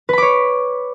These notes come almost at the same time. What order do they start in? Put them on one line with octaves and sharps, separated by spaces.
B4 B5 D6 C#5